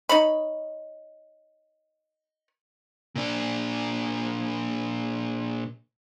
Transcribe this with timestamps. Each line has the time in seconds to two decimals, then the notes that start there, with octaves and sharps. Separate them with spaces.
0.09 D#4 C#5 B5
3.16 A#2 D4